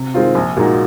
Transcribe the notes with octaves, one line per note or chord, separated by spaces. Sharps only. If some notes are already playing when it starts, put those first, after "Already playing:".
Already playing: C3
D#3 G#3 C4 F4
A#1
A#2 G#3 D#4 F#4